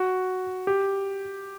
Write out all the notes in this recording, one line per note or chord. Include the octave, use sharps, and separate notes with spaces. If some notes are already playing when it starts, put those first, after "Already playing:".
Already playing: F#4
G4